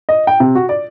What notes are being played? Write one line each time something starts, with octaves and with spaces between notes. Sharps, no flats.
D#5
G5
C3
F#4
D5